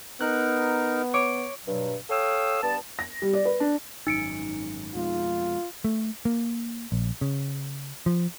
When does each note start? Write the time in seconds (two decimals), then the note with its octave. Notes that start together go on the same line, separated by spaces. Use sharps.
0.21 B3 D#4 A#4 F#6
1.14 C#5 D6
1.66 G2 B2 F#3
2.09 A4 C#5 F5 G5 D#6 E6
2.62 G2 B3 D5 A5
2.99 A#6
3.22 G3
3.33 D5
3.45 B4
3.60 D4
4.07 G#1 F#2 D#4 C#7 D7
4.95 F2 B2 G#3 F4
5.84 A3
6.25 A#3
6.92 A#1
7.21 C#3
8.06 F3